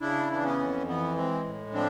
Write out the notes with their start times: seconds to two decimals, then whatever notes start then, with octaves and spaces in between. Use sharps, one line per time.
0.01 C#3 D4 E4
0.30 E3 D4
0.44 B3 C#4
0.59 F2
0.87 E3 B3
1.16 G#3 C4
1.45 A2
1.74 F3 C4 D4